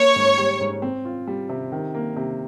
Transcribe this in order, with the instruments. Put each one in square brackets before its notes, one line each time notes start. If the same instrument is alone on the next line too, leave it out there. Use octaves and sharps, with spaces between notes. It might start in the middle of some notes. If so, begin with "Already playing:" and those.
Already playing: [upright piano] A#3 [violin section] C#5
[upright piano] G#2
G3
G#2
C4
F4
G3
C3
D#3
A#3
C3